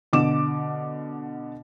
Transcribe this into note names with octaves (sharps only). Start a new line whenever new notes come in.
B2 D3 D6 E7